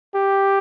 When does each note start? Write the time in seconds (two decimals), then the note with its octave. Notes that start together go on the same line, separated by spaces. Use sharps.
0.15 G4